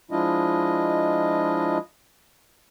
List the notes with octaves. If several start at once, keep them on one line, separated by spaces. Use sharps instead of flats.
F3 G#3 D4 E4 F4 D#5